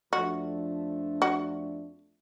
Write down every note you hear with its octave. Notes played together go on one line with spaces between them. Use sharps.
F2 F3 A3 D4 F#4
F#4